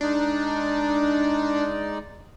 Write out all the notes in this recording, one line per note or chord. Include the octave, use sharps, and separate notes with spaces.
G#3 D4 D#4 D5